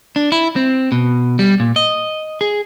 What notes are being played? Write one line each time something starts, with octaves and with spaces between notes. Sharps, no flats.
D4
E4
C4
B2
G3
A#2
D#5
G#4